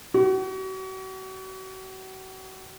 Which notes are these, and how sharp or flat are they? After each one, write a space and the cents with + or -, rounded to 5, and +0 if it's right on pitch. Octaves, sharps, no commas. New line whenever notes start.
F#4 +40